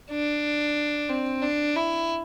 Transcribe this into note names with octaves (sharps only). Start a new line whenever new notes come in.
D4
C4
D4
E4